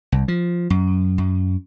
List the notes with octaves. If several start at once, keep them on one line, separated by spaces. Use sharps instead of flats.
C2
F3
F#2
F#2